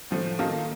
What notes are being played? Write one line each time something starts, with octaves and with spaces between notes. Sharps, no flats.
A2 F3 A3
D#3 A#3 F4 A4